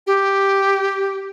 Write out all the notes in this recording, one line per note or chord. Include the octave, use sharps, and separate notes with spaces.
G4